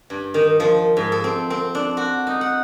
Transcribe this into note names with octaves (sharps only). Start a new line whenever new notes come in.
G2
D#3
F3
G#2
A4
C4
C4
D4
F#4
D#4
F#5